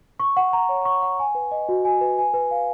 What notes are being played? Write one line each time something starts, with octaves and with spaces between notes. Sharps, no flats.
C#6
F#5
A#5
C#5
C#6
F#5
G#5
B4
D#5
F#4
G#5
B4
G#5
B4
F5